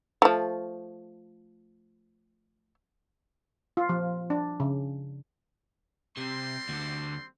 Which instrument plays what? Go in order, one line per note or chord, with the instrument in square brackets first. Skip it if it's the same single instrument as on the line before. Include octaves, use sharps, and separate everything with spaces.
[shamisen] F3 A3
[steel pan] F4
F3
D4
C#3
[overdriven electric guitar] C3 [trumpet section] G3 C4 C6
[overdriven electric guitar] D2 D3